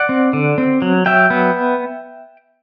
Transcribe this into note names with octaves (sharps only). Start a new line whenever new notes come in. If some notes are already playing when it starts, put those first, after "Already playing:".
Already playing: D5 F#5
C4
D3
C4
F#3
F#3 E5 G5
B3